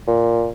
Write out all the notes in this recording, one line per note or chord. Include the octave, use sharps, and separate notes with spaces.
A#2